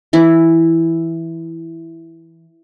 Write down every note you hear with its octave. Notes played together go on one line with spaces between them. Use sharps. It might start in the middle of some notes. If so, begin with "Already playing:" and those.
E3 E4